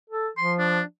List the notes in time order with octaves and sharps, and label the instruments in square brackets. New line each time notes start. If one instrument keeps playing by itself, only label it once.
[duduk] A4
[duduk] F3 [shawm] C6
[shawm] D4